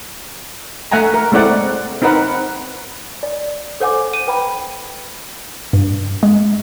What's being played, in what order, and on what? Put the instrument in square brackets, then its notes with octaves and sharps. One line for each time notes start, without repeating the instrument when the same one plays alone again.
[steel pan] A3 E5 F#5 G#5 A#5
A#4
G#3 A3 C4 E4 D5 F#5
C4 D#4 A#4 B4 F#5
[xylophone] D5
A4 C5 F#5 G#5 D6
D#7
B4 G5 A#5 B5
[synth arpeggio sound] G2
G#3